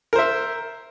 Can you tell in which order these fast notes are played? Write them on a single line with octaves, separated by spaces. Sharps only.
A#4 C5 E5